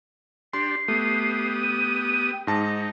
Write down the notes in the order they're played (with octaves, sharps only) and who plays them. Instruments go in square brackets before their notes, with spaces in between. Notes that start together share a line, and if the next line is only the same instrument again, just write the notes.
[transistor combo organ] D4 G4 [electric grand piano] C6 [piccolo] C7
[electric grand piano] A3 [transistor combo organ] B3 G4 D#6
[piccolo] D#7
G5
[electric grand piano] G#2 A5 [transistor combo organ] D#4 [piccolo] A#6